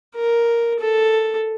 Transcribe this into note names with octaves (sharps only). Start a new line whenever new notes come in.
A#4
A4